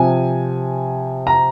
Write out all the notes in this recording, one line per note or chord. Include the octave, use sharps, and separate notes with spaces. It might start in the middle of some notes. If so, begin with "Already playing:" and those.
Already playing: C3 F3 G#5
A#5